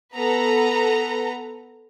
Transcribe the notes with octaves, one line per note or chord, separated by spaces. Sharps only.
B3 A4 B4 A#5